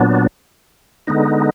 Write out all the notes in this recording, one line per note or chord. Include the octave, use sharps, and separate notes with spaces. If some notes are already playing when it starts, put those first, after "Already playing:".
Already playing: A#2 F#3 B3 D4
D3 G#3 B3 D#4